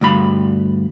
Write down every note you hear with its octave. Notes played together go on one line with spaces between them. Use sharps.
D2 G2 B5